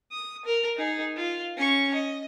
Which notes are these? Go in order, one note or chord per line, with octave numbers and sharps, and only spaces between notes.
D#6
A#4
D#4 G#4
F4
C#4 C#6
D#5